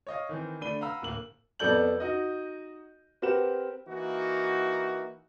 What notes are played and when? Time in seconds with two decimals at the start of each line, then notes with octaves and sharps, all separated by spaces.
0.07 C#5 D#5 F5
0.29 D#3 E3 C4
0.61 D3 A3 D4 B5 D#7 G7
0.81 F5 F#5 A#5 B5 E6
1.02 D1 A#3 F#7
1.59 F2 B3 A4 D5 G6 F#7
2.00 D#4 F#4 D#5
3.22 C4 G4 A#4 B4 F#5 E7
3.87 E3 A#3 D#4 F#4